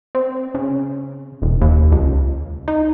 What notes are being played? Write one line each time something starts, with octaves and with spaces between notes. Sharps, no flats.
C4
C#3
E1
D#2
C#2
D#4